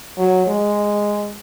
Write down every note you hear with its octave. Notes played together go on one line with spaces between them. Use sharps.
F#3
G#3